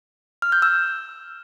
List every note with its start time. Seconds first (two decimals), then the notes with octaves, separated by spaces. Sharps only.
0.42 F6
0.52 G6
0.62 E6